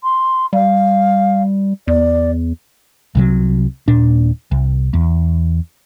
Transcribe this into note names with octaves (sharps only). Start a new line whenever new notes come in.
C6
G3 F5
E2 D5
C2 C3 F#3
D#1 A#2 D4
C2
E2